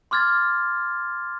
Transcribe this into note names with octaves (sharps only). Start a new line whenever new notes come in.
C6 D6 F6 G#6 A6